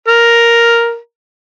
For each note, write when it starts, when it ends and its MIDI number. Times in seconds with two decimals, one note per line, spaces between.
0.08 0.97 70